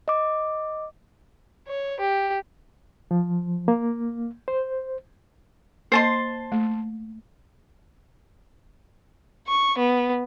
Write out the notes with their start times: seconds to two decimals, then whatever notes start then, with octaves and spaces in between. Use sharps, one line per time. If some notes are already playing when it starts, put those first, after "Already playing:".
0.08 D#5 D6
1.68 C#5
2.00 G4
3.11 F3
3.68 A#3
4.48 C5
5.92 A#3 C5 D#5 A5 C6
6.52 A3
9.47 C#6
9.78 B3